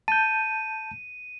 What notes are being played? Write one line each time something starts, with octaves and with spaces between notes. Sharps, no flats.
A5 G6 D#7